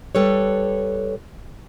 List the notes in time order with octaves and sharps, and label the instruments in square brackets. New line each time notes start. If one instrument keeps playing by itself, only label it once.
[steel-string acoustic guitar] G3 A4 B4 C#5